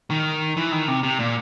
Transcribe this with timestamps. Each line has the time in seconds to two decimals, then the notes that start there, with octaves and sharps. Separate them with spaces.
0.10 D#3
0.57 E3
0.72 D#3
0.88 C3
1.03 C3
1.19 A#2